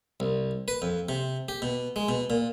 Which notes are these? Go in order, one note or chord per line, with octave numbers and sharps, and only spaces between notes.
C2
B4
F2
C3
G4
B2
G#3
B2
A#2